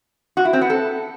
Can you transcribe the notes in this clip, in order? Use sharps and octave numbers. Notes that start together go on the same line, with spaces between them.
F#4
E4
C4
B3
A4